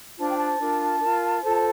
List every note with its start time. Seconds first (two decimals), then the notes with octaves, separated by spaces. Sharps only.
0.18 D4 F4 C5 A5
0.27 G5
0.37 A5
0.59 D4 F4 A#4
1.00 F4 A#4
1.42 F4 A4 C5